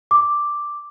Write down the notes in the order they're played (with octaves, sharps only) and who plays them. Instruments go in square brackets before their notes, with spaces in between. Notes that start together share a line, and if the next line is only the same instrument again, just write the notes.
[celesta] D6